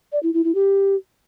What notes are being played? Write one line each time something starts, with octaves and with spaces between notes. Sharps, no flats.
D5
E4
E4
E4
G4